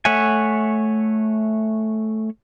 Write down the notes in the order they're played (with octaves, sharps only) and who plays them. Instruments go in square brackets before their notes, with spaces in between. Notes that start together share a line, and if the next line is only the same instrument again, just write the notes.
[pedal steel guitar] A3 C#5 E5 F#5 G#5